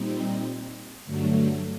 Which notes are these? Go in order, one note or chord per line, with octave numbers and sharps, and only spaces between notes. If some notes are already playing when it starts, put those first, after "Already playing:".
Already playing: A#2 G3 C4 D#4
G2 D3 F#3 A3